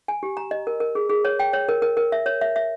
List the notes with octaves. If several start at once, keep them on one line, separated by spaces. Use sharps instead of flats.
G#5
G4
A#5
D#5
A#4
A#4
G#4
G#4
C#5
G5
C#5
A#4
A#4
A#4
E5
C#5
E5
E5